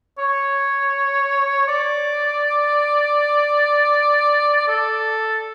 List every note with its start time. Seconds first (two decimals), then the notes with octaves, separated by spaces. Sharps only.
0.18 C#5
1.68 D5
4.68 A4